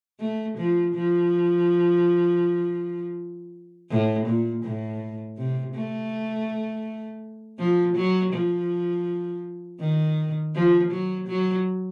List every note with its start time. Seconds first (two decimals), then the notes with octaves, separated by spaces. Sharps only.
0.20 A3
0.58 F3
0.95 F3
3.90 A2
4.27 A#2
4.64 A2
5.37 C3
5.75 A3
7.59 F3
7.96 F#3
8.33 F3
9.80 D#3
10.55 F3
10.91 F#3
11.28 F#3